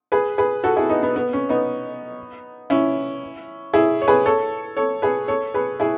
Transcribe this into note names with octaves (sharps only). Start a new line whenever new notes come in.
G#4 B4
G#4 B4
F#4 A4
E4 G#4
B3 D#4
B3
B3
C#4
B3 D#4
C#4 E4
E4 G#4
C#5
G#4 B4
A4 C#5
A4 C#5
G#4 B4
A4 C#5
G#4 B4
E4 G#4